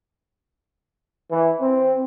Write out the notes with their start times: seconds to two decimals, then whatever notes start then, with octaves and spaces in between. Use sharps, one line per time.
1.31 E3
1.61 C4